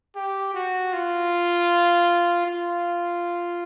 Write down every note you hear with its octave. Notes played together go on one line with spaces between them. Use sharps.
G4
F#4
F4
F4